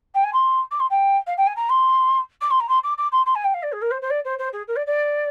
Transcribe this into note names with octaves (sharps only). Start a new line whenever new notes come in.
G5
G#5
C6
D6
C6
G5
F5
G5
G#5
A#5
C6
D6
C6
A#5
C6
D6
D6
C6
C6
G#5
G5
F5
D5
G#4
A#4
C5
C5
D5
C5
C5
G#4
A#4
D5
D5